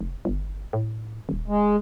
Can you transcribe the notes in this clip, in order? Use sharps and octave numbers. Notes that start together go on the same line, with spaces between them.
F1
G1
A2
D#1
G#3